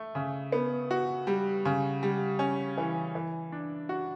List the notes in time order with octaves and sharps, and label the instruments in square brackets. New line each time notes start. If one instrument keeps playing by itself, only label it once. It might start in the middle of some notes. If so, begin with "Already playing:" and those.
Already playing: [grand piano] A3
C#3
B3
F#4
G3
C#3
G3
C#4
E3
E3
D4
F#4